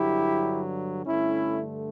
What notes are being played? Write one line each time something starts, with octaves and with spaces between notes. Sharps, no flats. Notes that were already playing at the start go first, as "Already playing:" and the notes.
Already playing: G2 D3 F#3 E4 G4
G2 D3 A3 C#4 E4